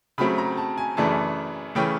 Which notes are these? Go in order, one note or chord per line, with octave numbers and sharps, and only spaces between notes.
C#3 F#3 A3 C4 B5
A#5
A5
G#5
F#2 C#3 E3 A3 D4 A5
C#3 E3 A3 C#4 G5